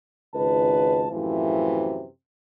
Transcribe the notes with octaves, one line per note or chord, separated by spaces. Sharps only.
G#1 C#2 D#4 B4 A5
F#2 A2 C3 E3 F3